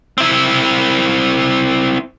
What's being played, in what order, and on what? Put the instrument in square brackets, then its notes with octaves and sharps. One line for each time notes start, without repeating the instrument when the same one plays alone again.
[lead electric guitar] C4 E4